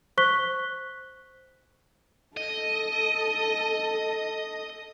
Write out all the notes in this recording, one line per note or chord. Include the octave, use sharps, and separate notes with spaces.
C5 C#6 F#6 B6 G7
A4 D#5